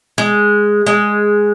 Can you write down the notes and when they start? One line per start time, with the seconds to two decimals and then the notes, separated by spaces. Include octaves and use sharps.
0.18 G#3
0.86 G#3